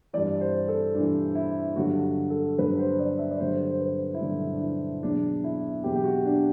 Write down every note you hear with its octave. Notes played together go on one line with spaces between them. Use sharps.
G2 E3 D5
C5
A4
G2 E3 D4
E4
G2 D3 F#3 F#4
A4
G2 D3 F#3 B4
C5
D5
E5
D5
G2 D3 F#3 C5
C5
B4
E4
G2 D3 F#3 D4
D4
E4
E2 B2 F#3 D4
E4
E2 B2 F#3 G4
G4
F#4
D4